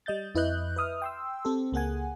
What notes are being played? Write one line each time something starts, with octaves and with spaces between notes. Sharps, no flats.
G3 D#5 G6 A6
F2 E4 B4 D#5 F#6 G6
B4 E5 D#6 F6
G5 C6 E6
C4 G4 A4
C#2 A#3 G#4 F#5 G#5